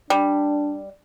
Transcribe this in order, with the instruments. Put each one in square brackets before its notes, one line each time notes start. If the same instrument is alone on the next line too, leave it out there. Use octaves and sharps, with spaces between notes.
[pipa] G3 [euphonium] D4